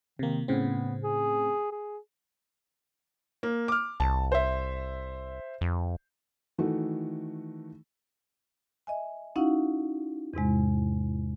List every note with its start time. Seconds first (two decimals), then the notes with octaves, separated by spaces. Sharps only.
0.19 C3 D#3 A#3
0.48 A2 C#3 B3 C4
1.03 G#4
1.72 G#4
3.43 A#3
3.68 D6 F6
4.00 C2 A5
4.32 C5 E5
5.61 F2
6.58 D#3 E3 A3 F#4
8.87 D#5 E5 G#5
9.36 C#4 D#4 E4 F#4 F5 F#5
10.34 E2 G#2 C3 G#3